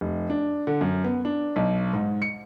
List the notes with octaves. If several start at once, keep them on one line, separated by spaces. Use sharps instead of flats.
F1
D4
D3
F#2
B3
D4
B1
G#2
C#7